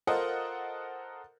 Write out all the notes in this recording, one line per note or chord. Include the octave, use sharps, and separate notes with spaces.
F4 A4 A#4 C5 D#5 F#5